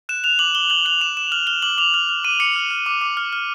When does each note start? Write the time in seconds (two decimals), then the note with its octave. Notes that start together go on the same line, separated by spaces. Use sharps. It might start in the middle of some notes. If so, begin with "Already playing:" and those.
0.09 F#6 E7
0.24 F#6 F7
0.39 D6 F#7
0.55 D6 G7
0.70 F#6 F#7
0.85 F#6 F7
1.01 D6 E7
1.17 D6 E7
1.32 F6 F#7
1.47 F6 G7
1.62 D6 F#7
1.78 D6 F7
1.94 F6 F7
2.09 F6
2.25 D6 D#7
2.39 D6 C#7
2.56 F6
2.71 F6
2.86 D6
3.01 D6
3.17 F6
3.33 F6